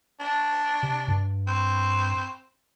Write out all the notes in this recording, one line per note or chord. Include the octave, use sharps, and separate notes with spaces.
D4
C3
G2
C4